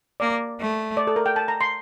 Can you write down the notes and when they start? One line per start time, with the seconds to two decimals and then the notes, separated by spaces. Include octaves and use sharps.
0.20 A#3 D5
0.59 A3
0.97 D5
1.07 A4
1.16 A#4
1.26 G5
1.36 A5
1.48 A#5
1.61 C6